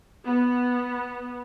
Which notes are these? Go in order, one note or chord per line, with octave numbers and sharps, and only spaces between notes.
B3